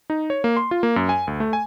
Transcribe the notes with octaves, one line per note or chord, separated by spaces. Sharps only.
D#4
C#5
A#3
C6
F4
A#3
F#2
G#5
D2
A3
G#5